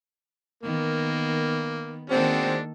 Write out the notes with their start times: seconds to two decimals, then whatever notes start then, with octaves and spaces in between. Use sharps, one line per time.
0.63 D#3 A#3 B3
2.10 D#3 G#3 A#3 C4 D4 F#4 A4